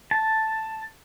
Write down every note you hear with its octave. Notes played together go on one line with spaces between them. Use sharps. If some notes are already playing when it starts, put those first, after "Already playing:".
A5